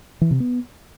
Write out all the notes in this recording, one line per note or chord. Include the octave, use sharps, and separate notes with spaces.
E3
C3
B3